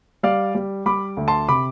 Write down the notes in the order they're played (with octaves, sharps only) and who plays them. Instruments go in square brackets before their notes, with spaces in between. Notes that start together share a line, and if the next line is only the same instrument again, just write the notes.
[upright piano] G3 [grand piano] D5 F5
[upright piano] G3
[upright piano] G3 [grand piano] B5 D6
[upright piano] D2
[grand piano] A5 C6
[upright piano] C3 [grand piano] B5 D6